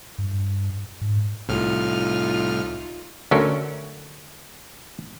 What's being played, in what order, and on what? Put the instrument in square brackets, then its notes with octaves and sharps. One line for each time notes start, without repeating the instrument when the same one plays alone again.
[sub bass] G2
G#2
[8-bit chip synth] C2 A2 F6 [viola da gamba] D#4 F4
[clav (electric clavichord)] D2 F#3 C#4 A4 A#4